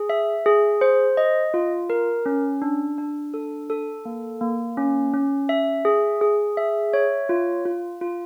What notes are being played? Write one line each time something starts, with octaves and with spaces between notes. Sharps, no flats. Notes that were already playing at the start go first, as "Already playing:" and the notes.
Already playing: G#4
E5
G#4
C5
D#5
F4
A#4
C#4
D4
D4
A4
A4
A#3
A#3
C#4
C#4
E5
G#4
G#4
E5
C#5
F4
F4
F4